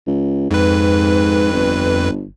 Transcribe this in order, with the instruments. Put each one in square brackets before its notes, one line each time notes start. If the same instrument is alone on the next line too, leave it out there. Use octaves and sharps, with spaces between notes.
[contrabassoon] C#2
[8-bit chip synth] F2 B4 [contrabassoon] G#2
[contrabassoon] G1